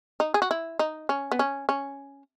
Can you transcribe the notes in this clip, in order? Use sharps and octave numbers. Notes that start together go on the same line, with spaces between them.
D#4
G#4
F#4
E4
D#4
C#4
B3
C#4
C#4